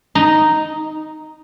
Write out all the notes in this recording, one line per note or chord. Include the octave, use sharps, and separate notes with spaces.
D#4